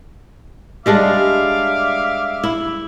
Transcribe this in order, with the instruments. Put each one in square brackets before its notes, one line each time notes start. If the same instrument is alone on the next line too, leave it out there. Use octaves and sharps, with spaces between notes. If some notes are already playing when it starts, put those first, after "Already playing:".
[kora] G3 G#3 D4 [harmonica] E5 F5 D6
[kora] E4